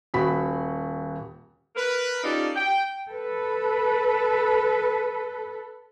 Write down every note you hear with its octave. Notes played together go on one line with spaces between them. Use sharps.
D#1 F#4 B5 B6
A#4 B4
C#4 D#4 F4 G4 A4 D5
G5
A4 B4